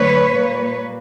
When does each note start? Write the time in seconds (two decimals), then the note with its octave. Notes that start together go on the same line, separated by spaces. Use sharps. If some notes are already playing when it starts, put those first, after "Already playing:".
Already playing: D3 F#3 A3 B4 C#5
0.32 A#2 G3 A#3